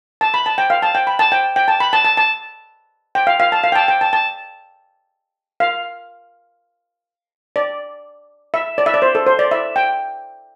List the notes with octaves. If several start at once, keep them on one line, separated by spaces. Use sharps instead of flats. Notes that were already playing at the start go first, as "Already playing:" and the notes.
A5
B5
A5
G5
F5
A5
G5
B5
A5
G5
G5
A5
B5
A5
A5
A5
G5
F5
F5
A5
F5
G5
A5
G5
A5
A5
F5
D5
E5
D5
E5
D5
C5
A4
C5
D5
E5
G5